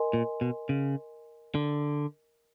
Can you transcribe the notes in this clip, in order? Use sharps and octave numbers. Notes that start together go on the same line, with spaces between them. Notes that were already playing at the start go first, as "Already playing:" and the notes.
Already playing: A#4 D#5 G#5 C6
A#2
B2
C#3
D3